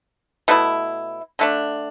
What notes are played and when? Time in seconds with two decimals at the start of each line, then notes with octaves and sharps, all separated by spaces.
0.48 B2 A3 E4
1.39 D3 A3 D4